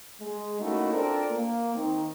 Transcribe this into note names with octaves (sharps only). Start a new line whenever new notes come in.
G#3
A3 A#3 C#4 D#4 E4 F#4
C4 D4 F4 A4 A#4 C5
A#3
D#3 C4 D#4